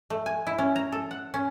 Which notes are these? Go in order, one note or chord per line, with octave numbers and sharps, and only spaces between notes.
A3
G#5
E4
C#4
A#5
A4
F#5
C#4